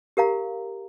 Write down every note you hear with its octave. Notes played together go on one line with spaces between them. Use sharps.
G4 A#4 F5 A#5